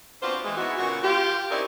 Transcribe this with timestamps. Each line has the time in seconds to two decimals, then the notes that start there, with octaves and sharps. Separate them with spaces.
0.23 B3 C4 D4 F4 F#4 C5
0.44 E3 G#3
0.57 G#3 B3 D#4 E4 F#4
0.78 A#2 C#3 B3 F#4
1.04 F4 G4
1.50 C4 C#4 D#4 E4 A#4 D5